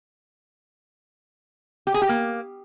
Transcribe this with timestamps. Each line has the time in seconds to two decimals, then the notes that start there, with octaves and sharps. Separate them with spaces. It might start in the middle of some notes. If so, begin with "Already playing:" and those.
1.87 G4
1.94 G#4
2.02 G4
2.09 A#3